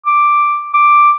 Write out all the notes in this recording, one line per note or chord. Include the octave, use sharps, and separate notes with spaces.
D6
D6